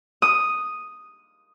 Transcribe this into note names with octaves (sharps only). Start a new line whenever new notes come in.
D#6